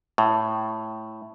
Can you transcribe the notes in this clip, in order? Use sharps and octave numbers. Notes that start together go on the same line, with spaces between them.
A2